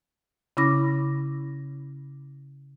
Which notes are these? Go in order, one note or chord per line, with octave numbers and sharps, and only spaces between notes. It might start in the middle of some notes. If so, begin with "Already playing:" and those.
C#3 C#4 E4 B5 D6 A#6